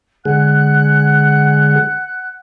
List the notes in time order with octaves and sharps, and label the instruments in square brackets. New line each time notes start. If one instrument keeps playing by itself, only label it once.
[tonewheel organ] D3 G#3 G#4 [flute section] F#5 F#6